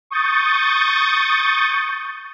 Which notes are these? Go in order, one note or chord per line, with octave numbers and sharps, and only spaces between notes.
C#6 D#6 G6 A6